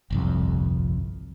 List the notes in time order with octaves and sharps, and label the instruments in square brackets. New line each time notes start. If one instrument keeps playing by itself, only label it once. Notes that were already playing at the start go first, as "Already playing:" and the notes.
[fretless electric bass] G1 C2 F2